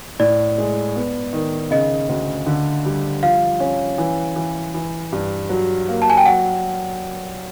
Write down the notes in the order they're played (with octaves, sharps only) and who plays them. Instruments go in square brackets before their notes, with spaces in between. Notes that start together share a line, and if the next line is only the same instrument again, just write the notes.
[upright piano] A2 [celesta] D5
[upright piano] G#3
B3
D#3
[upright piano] C#3 [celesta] D#5
[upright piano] D2
D3
G3
[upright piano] F3 [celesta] F5
[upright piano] C#4
E3
E3
E3
G2
F#3
A#3
[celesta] A5
G#5
G5
[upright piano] F#3 [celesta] F#5